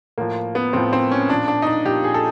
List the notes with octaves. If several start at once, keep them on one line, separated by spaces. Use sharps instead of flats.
A2 F3 A#3
B3
A2 F3 C4
C4
C#4
A#2 F3 D4
D4
D#4
D4
A#2 F3 G4
G#4
A4